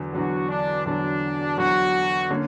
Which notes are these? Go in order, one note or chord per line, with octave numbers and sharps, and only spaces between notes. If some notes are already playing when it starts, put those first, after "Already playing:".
Already playing: E2 D3 F#3
E2 D3 F#3 F#4
D4
E2 D3 F#3 D4
E2 D3 F#3 F#4
D3 A#3 C#4